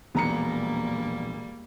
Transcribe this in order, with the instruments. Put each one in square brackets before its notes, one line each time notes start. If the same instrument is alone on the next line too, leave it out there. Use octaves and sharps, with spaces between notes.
[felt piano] E1 A#5 C#7 [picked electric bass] A#1 B3 [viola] G3 A#3